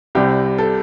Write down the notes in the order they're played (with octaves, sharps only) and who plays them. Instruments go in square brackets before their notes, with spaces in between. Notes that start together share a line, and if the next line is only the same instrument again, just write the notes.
[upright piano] C2 C3 G3 G4
A4